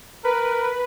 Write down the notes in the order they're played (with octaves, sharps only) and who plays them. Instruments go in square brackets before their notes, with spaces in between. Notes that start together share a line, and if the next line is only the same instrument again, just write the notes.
[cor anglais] A#4 [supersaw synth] B4